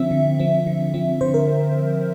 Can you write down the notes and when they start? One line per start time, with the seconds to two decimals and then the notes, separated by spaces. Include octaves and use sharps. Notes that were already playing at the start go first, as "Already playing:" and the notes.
Already playing: D3 F3 C4 E5
0.11 D3
0.39 F3 C4
0.67 D3
0.94 F3 C4
1.21 D3 C5
1.34 A#4